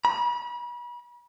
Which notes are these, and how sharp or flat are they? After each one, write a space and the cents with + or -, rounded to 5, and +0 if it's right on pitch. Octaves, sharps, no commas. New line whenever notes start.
B5 -35